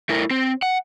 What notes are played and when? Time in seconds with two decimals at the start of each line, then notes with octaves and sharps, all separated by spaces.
0.09 A3 E4 A#4
0.31 C4
0.62 F#5